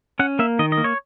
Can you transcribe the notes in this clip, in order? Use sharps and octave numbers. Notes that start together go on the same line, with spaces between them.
C#4 F#5
A#3 E5
D#3 D#5
D#5
A#3
C#5